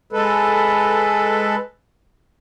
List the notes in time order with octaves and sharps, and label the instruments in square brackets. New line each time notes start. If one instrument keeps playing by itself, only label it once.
[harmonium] G#3 A4 B4